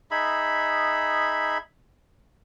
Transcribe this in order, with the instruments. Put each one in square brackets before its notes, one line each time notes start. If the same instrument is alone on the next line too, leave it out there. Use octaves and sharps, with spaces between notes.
[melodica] D#4 G#4 E5 B5